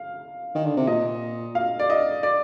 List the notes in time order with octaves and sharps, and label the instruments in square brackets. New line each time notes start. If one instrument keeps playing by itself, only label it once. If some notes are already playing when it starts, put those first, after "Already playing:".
Already playing: [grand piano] F5
[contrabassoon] D#3
D3
C3
[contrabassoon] A#2 [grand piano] D#5
[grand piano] F5
D5
D#5
D5